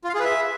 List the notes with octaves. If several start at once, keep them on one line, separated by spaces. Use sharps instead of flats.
F4
F5
G#4
B4
E5